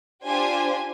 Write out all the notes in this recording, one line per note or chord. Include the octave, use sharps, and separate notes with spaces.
D4 F4 G4 C5 G#5